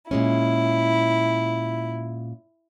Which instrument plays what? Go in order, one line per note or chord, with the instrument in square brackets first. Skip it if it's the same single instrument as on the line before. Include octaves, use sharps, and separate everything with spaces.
[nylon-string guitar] A#2 G#3 C#4 [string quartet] E4